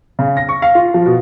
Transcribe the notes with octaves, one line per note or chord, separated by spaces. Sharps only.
C#3
A#6
C#6
F5
F4
F3
B2